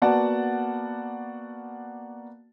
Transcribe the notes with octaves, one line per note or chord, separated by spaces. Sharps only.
A#3 B3 F#4 D5 F#5 A5